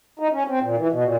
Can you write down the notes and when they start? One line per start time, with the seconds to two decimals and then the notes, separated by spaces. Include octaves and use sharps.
0.20 D#4
0.33 C#4
0.48 C4
0.62 A#2
0.77 E3
0.92 B2
1.04 A#2